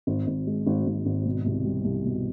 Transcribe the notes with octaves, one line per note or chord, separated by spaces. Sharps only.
G#1
G#1
G#3
G#1
G#1
G#1
B2
C2
G3
C2
B2